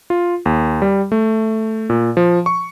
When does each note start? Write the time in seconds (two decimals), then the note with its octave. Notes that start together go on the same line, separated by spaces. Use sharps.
0.10 F4
0.46 D#2
0.82 G3
1.12 A3
1.90 A#2
2.17 F3
2.46 C#6